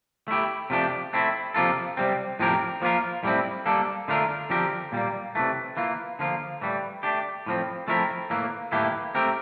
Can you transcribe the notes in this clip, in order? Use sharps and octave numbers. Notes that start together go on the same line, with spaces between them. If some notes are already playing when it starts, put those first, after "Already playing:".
A3 E4 G4
C3 F3 A3 D4 G4
A3 C4 E4
C3 F3 A#3 F4 A4
C3 G3 C4
A2 F3 C4 G4 A#4
F3 A#3 F4 A#4
A2 G3 C4 E4
G3 A#3 D4 A4
D3 A3 D4 F4 A#4
D3 F3 C4 G4 A#4
A#2 G3 A#3
C3 E3 A3
E3 A#3 F4
D3 F3 A#3 F4
A2 E3 G3
A3 D4 G4
A2 F3 C4
F3 A3 C4 E4 A#4
A2 E3 A#3
A2 E3 A#3 E4 G4
A3 C4 G4 A#4